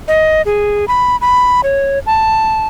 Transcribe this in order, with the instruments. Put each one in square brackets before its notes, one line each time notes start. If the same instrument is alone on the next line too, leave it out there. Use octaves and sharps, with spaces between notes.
[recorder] D#5
G#4
B5
B5
C#5
A5